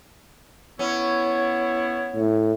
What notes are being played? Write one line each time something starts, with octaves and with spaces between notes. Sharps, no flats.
B3 C#4 E4 C#5
A2